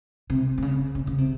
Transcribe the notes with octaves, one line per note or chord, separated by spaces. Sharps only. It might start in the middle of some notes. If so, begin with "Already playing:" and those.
C3
C3
C#3
C3
C#3
C3